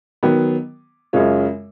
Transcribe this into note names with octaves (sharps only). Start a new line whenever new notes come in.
D#3 F#3 B3
F#2 C#3 G#3 C#4 F4